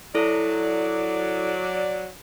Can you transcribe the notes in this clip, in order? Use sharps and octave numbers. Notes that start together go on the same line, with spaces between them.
F#3 E4 A4 D5